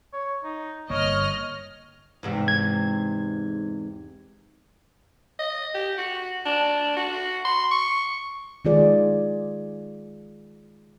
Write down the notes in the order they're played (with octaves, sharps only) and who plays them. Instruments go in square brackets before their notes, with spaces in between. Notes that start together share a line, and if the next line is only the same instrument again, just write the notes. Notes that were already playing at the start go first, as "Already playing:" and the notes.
[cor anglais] C#5
D#4
[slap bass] G1 A#3 [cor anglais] C#5 [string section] D#5 F6
[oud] E2 G#2 C3
[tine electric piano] G#6
[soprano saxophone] D#5
G4
F#4
D4
F#4
C6
C#6
[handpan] D#3 G#3 F4 G#4 D5